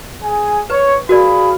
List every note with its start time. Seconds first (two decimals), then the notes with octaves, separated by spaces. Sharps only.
0.23 G#4 G#5
0.70 B4 C#5
1.09 F#4 G#4 A#4 D5 F5 B5